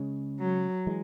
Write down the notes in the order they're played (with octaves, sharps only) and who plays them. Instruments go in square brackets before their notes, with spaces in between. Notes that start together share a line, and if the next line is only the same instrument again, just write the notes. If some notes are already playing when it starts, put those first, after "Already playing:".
Already playing: [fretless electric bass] C#3 G#3 C#4
[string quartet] F#3
[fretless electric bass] E3 G#3